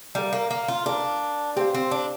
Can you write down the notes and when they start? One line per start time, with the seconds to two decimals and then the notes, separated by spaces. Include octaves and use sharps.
0.15 G3 A#4 F5 A#5
0.33 A#3
0.51 A#3
0.68 F4
0.86 D4 A#4 F5 A#5
1.56 C4 G4 C5 F5
1.74 C4
1.91 D4